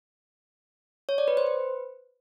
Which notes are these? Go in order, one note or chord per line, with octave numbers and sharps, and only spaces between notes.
C#5
D5
B4
C5
B4